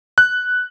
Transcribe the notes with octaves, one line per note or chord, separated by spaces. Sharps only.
F#6